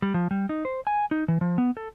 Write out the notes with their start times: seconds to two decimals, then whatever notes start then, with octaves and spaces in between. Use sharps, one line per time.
0.02 G3
0.14 F3
0.31 G3
0.49 D#4
0.65 C5
0.87 G#5
1.11 D#4
1.28 E3
1.41 F3
1.58 B3
1.77 A4